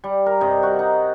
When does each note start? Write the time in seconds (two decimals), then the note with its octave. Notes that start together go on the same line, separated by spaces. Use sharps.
0.04 G3
0.26 A#4
0.41 G2 C3 D#5
0.63 F#4
0.79 D#4